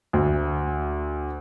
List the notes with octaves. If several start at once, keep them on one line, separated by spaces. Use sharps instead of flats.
D2